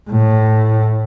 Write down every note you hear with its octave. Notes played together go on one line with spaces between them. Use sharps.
A2